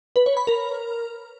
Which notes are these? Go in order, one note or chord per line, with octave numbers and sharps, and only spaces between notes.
B4
C#5
B5
A#4